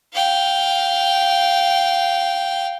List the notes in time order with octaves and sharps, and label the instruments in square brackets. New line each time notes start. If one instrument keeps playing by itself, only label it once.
[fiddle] F5 G5